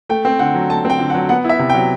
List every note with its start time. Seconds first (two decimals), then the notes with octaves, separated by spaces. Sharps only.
0.09 A3 G5
0.25 C4
0.39 D3 F#5
0.55 F#3
0.70 A3 A5
0.85 C4 G5
0.99 D3
1.10 F#5
1.15 F#3
1.29 B3 F#5
1.45 E4 E5
1.59 C3
1.70 G5
1.75 F#3